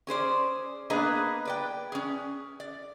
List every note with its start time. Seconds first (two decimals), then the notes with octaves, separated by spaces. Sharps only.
0.07 C#4 G#4 C5 D5
0.90 A#3 B3 D4 G#4 B4 D#5
1.45 B4 D5 G5
1.92 C#4 G#4
2.60 D5